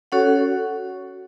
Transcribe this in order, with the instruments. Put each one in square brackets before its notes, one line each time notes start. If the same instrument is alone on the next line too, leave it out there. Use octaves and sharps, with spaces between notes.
[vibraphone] C#4 F#4 A4 C#5 F#5